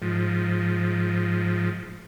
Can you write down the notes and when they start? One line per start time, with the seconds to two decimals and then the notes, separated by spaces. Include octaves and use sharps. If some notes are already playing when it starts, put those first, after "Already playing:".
0.02 G#2 F3